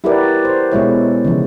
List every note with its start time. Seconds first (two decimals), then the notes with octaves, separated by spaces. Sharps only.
0.04 E4 F#4 G4 A#4 B4 D5
0.45 C5
0.72 B2 G#3 E4 C#5
1.25 C#3 E3 F3